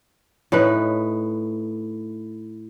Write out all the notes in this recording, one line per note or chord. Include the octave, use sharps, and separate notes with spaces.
A2 D#4 B4